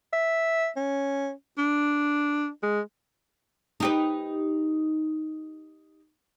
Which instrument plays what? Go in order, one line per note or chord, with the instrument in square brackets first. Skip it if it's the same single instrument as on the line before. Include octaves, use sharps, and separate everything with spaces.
[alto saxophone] E5
C#4
D4
G#3
[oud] D#4 G4 B4